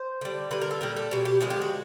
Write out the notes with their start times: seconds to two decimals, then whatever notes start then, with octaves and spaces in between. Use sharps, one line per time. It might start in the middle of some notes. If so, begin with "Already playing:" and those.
Already playing: C5
0.21 D3 G3
0.51 D3 G3 B4
0.62 A#4
0.71 A4
0.81 A#2 G3 A#4
0.97 A4
1.11 B2 G3 G#4
1.25 G4
1.41 D3 F3 G#3 G#4
1.50 G4
1.62 F#4